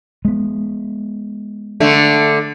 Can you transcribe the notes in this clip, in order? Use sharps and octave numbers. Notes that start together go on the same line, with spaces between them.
G#3 B3
D3 A3